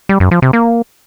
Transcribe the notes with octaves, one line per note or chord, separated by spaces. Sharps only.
G3
F#2
F3
C3
A#3